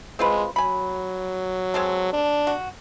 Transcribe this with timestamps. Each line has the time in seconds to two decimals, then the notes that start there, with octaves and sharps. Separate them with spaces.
0.19 G#3 C4 F4 B4
0.56 F#3 G#5 B5
1.74 G#3 C4 A4
2.13 D4
2.47 F#4